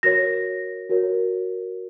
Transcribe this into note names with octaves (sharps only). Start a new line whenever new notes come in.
F#4 A#4 C#5 A#6
F#4 A#4 C#5